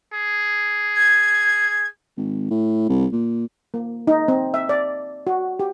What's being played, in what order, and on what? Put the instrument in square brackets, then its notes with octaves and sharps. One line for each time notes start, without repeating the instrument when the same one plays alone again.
[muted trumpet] G#4
[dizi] G#6
[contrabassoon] G#1
A2
C2
A#2
[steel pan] A#3
D#4
C4
E5
D5
F#4
G4